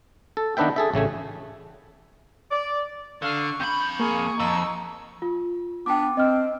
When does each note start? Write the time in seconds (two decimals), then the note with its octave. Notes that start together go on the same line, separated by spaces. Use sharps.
0.37 A4
0.57 D#3 B3 D4 B4 E5 G5
0.76 G#4 A4 E5
0.94 A1 C#3 A3 G#5
2.51 D5
3.22 D3 F5 C#6
3.60 F2 B5 G6
3.99 A#3 G#4 C#6
4.40 F2 D#4 E6
5.22 F4
5.86 B3 D4 G5 D6
6.17 C4 D#5 F6